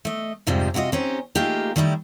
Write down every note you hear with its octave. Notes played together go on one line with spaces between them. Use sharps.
A3 D#5
F2 G#2 C3 F3 G3 G#3
C3 F4 F#4 C#5 D#5
C4 C#4 D#4 G4
A3 A#3 D#4 F4 G4 G#4
D#3 G3 A3 D#4 E4